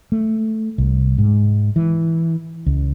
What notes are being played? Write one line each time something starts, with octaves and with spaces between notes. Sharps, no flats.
A3
C2
G#2
E3
C#2